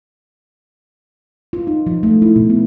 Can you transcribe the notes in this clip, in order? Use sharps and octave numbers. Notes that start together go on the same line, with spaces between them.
F4
D#4
F3
A3
E4
B2
B3